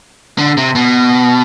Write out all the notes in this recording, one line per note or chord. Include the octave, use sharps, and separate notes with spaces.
D3
C3
B2